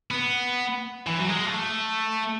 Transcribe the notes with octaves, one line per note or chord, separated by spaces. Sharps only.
B3
E3
F#3
G#3
A3